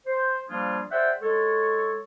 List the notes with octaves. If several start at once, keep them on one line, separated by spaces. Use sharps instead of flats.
C5
F3 G3 A#3 D4 F4 G#4
G#4 C5 D5 E5 F#5 G5
G#3 A4 C#5